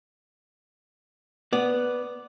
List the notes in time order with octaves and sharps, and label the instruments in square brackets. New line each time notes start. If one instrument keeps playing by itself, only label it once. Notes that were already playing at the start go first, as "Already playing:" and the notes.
[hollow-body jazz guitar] B3 [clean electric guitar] D5